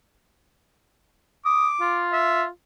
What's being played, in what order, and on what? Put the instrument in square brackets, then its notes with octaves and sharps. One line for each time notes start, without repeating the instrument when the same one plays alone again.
[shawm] D6 [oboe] D#6
[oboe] F4
[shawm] E5